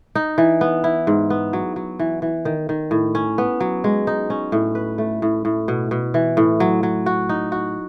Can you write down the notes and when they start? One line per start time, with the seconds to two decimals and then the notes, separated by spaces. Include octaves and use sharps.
0.15 D#4
0.38 E3
0.61 B3
0.84 E4
1.07 G#2
1.30 B3
1.53 F#3
1.76 F#3
1.99 E3
2.22 E3
2.45 D#3
2.69 D#3
2.91 A2
3.15 C#4
3.38 B3
3.60 F#3
3.84 G#3
4.07 D#4
4.30 C#4
4.52 A2
4.75 B4
4.98 A3
5.22 A2
5.45 A2
5.68 B2
5.91 B2
6.14 E3
6.37 A2
6.60 F#3
6.83 F#3
7.06 F#4
7.29 D#4
7.52 F#4